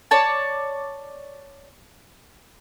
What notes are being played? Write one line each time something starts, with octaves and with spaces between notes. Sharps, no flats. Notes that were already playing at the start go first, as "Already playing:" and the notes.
C#5 D5 A5